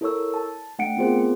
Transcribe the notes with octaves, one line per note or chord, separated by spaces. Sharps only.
E4 A4 A#4 C#5 C#6 E6
A5
A3 D4 F#5 G5 C#7 D7
B3 C4 F4 G#4 A#4 C5